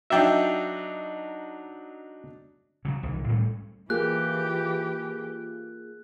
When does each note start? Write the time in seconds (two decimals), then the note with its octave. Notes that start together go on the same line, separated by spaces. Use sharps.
0.10 F#3 D4 D#4 E5 G5
2.85 C#3 F3 F#3
3.03 F#1 C2 D#3 E3
3.29 A2 G3 A3 C#4
3.90 E3 A#3 F4 G4 G#4 F#6